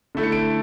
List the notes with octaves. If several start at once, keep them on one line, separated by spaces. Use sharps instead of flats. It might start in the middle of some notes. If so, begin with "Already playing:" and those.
D3 A3 E4
C#7
D7